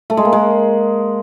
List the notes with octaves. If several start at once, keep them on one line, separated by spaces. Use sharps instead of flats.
A3
G#3
A#3
G#3